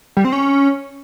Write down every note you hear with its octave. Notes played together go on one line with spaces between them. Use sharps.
G3
C4
C#4